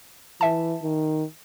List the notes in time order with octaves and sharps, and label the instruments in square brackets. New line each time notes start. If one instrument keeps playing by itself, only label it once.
[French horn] E3 [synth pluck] E5 A5
[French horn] D#3